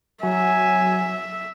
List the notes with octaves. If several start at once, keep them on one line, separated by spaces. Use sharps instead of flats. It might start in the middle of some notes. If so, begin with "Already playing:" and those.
F#3 E5 G#5